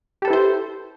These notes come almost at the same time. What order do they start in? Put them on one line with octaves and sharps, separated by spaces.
G4 A4 B4 E4 C5